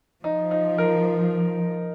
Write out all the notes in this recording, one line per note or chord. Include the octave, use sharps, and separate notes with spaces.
F3 D#4
D#4
A#4